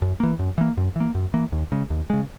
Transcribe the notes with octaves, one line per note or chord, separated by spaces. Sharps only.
F#2
E3 A#3
F#2
E3 A#3
F#2
E3 A#3
F#2
E3 A#3
D#2
C#3 G#3
D#2
C#3 G#3